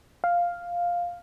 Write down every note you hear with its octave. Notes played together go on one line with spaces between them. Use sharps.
F5